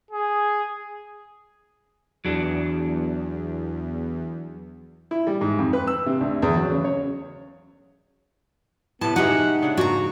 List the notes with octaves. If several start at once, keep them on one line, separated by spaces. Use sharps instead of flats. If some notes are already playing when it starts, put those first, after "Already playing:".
G#4
E2 F#3 D4
E4
G3
G#2
F2
B4
E6
C3
D2
E2
F#3
C#3
C#5
A2 C3 B3 A5
G#3 D#4 F#4 G4 E5 F#5
C#3 D4 F#5
G#2 A#3 F#4 A#5